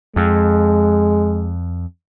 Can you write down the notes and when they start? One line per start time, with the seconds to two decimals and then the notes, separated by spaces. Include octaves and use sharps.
0.16 F2 G#3